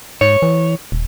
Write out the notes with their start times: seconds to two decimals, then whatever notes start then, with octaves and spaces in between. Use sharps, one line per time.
0.21 G#2 C#5
0.42 E3
0.92 D#1